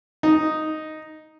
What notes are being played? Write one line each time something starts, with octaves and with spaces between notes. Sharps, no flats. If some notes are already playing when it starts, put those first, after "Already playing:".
D#4